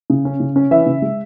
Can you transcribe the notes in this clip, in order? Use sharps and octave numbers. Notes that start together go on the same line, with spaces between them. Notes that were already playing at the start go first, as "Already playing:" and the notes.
C#3
C#4
C#3
C#4
E3 E5
C#3
G#3